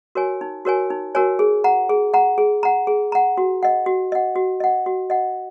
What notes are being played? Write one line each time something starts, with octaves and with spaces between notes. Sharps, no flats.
F#4 A#4 C#5 G#5
D#4
F#4 A#4 C#5 G#5
D#4
F#4 A#4 C#5 G#5
G#4
F#5 A#5
G#4
F#5 A#5
G#4
F#5 A#5
G#4
F#5 A#5
F#4
D#5 F#5
F#4
D#5 F#5
F#4
D#5 F#5
F#4
D#5 F#5